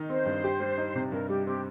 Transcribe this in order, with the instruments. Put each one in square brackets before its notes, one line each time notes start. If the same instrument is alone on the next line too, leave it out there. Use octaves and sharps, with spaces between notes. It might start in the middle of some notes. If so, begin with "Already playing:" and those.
Already playing: [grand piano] D#3 D#4
[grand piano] C4 [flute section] C5
[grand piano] G2
G4
G3
D#4
C3
[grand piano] G2 [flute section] A#4
[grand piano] G3 [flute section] G4
[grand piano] C4 [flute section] G4